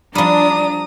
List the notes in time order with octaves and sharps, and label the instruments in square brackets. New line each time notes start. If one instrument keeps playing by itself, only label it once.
[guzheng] F3 G3 [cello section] D4 [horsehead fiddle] A#5 [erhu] D#6